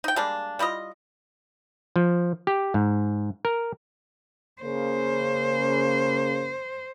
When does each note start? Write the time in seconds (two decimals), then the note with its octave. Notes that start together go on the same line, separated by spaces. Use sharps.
0.04 D#4 G5
0.16 G3 G#3 A#3 D4
0.59 G3 E4 F4 D#5
1.96 F3
2.47 G4
2.74 G#2
3.45 A#4
4.62 C#3 A#3 C5